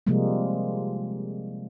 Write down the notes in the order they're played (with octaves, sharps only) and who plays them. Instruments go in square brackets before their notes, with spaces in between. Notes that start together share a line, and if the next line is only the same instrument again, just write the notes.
[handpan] C3 F3 G3 G#3 A#3